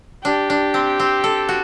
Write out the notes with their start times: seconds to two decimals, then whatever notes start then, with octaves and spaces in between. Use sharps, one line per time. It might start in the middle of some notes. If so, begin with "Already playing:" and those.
0.24 D4 G4
0.50 D4
0.74 C4
1.00 C4
1.24 A4
1.49 F#4